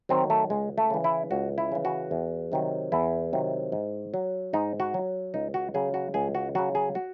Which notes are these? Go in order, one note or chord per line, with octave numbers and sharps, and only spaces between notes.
D#3 F#3 C4
A3
C#2 G#3
A3
C#3 E3
E4
C#2 F#4
E4
C#3 E3
F#4
E2
C3 D#3 F#3
E2 E4
C3 D#3 F#3
G#2
F#3
G#2 D#4
F#4
F#3
C#2 D#4
F#4
C#3 F#3 G#4
F#4
C#2 G#4
F#4
C#3 F#3 F#4
G#4
F#4